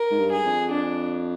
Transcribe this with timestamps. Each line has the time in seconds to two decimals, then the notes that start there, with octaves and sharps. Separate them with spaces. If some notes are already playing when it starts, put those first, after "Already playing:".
Already playing: A#4
0.11 G#2
0.19 G2
0.32 G#4
0.45 F2
0.72 D4